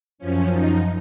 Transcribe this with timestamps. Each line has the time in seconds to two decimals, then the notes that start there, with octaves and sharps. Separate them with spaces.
0.18 F#2 F3 C#4
0.49 D#4